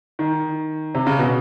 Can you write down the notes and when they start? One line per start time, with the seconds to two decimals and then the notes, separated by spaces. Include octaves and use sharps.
0.19 D#3
0.94 C3
1.06 C#3
1.19 B2